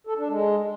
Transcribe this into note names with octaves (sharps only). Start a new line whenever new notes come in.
A4
D4
G#3